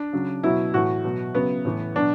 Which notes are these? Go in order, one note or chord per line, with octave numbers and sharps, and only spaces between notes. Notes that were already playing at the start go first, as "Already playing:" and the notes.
Already playing: D4
C#3 F#3
B2 F#3 E4
A2 E3 F#4
B2 F#3
C#3 F#3 B3
A2 E3
B2 F#3 D4